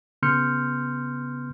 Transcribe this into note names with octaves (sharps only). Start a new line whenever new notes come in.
C#3 B3 C6 F6 G6 C#7